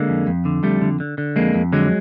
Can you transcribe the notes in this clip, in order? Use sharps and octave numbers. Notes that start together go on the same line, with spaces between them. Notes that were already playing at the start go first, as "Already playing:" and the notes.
Already playing: D3 G#3 A#3
F2
F2
D3
F2 G3 A3
D3
D3
D3
F2 G#3 A#3
F2
D3 F#3 G#3